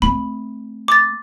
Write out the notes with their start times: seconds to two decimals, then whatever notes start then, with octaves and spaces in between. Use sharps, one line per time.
0.02 A3 C4 B5
0.88 D6 A6